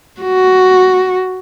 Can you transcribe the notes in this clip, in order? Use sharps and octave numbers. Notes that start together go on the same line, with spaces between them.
F#4